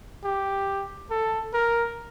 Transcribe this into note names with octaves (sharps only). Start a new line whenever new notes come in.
G4
A4
A#4